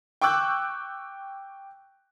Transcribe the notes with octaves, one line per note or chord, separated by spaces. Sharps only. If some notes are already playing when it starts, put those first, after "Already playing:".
G5 C#6 D6 E6 F#6 G6